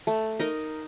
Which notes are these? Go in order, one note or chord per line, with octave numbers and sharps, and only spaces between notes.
A3
D#4 A#4 D#5